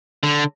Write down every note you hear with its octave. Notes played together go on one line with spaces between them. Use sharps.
D3